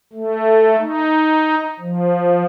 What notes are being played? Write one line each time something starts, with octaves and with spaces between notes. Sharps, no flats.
A3
D#4
F3